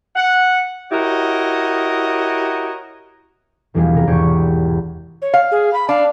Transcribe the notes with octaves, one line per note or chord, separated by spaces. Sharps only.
F#5
E4 F#4 G4 A#4 C#5 D#5
E1 E2 G3 G#3 F4 C7
C3 G3 A#4
G#1 E2 G4 C5 C#6 G#6
C#5
F5
G#4
B5
D4 F5